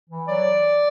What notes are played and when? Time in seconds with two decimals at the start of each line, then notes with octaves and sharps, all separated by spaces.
0.09 E3
0.27 F#3 D5